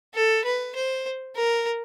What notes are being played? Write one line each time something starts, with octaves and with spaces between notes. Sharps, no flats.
A4
B4
C5
A#4